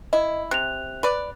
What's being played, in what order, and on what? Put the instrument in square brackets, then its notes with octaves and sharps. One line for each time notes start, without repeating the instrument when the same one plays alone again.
[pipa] E4 [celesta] D#5
[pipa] C3 [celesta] F#6 F7
[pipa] B4 D5